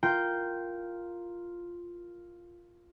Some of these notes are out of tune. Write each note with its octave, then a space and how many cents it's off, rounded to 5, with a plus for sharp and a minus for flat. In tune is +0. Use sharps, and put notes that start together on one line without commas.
F4 +0 A#4 +0 G5 -10